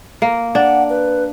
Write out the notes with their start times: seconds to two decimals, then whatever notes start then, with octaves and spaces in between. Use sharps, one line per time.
0.22 A#3
0.55 D4 F#5
0.90 B4